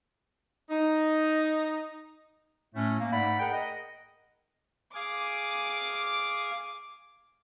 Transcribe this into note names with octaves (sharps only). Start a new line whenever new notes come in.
D#4
A2 A3 C#4
A#3
G#2 A3 D5 F#5 B5
G#4 A#4 F#5 G5
D#5
G#4 F5 G#5 D6